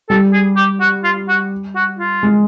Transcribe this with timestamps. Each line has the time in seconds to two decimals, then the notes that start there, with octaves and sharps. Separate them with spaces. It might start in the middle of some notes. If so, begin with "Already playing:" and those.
0.09 G3 A4
0.33 G#4
0.57 G4
0.80 F#4
1.04 F4
1.29 F#4
1.75 F#4
1.99 F4
2.23 G#3